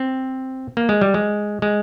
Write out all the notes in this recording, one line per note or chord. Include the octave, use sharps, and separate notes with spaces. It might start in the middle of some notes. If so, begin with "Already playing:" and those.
Already playing: C4
A#3
G#3
G3
G#3
G#3